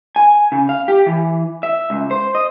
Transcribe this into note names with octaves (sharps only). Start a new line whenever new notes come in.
G#5
C#3
F5
G4
E3
E5
C#2
C5
D#5